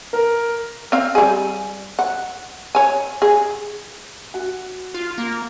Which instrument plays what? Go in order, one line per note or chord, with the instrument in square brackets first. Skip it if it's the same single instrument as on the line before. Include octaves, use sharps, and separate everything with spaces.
[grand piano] A#4
[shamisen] C4 F5
G3 G#4
F#5
C#5 G#5
G#4
[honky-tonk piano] F#4
[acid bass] F4
A#3